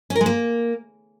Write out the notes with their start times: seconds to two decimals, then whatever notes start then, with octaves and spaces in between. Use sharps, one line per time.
0.10 C#4
0.15 A#4
0.21 G#3
0.26 A#3